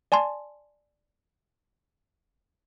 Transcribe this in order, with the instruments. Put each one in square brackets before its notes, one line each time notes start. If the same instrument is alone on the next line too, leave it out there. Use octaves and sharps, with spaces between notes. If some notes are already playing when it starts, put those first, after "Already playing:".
[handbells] D5 G#5 A5 C6